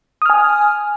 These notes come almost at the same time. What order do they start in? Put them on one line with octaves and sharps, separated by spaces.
D#6 F6 G#5